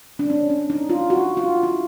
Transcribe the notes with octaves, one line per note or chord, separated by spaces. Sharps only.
D4
C#4
C#4
D#4
F4
F#4
F4
E4